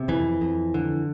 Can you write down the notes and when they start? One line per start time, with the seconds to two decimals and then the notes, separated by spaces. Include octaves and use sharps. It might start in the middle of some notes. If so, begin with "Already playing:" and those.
Already playing: C3
0.08 F2 E3
0.41 F2
0.74 D3